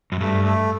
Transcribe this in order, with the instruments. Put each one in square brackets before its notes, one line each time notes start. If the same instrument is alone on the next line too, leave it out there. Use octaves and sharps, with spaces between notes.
[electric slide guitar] F#2
[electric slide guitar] G2 [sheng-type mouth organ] A3
[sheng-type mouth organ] A3